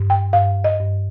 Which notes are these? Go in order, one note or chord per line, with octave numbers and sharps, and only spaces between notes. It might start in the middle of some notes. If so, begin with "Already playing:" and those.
Already playing: G2
G5
G2 F5
D#5
G2